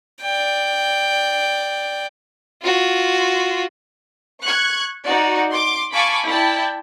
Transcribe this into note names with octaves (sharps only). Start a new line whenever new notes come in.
D5 G5
F4 F#4
C#6 F#6 G#6
D#4 F#4 D5
C6 D6
F5 G#5 A5 B5 C#6 D6
E4 D5 G5 A5